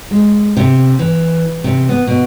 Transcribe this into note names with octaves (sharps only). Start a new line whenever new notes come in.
G#3
C3
E3
C3
B3
B2